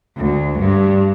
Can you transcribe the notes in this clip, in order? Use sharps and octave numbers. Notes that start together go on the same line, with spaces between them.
D2
G2